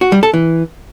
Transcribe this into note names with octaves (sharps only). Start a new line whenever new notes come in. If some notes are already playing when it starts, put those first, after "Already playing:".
F#4
G3
A4
E3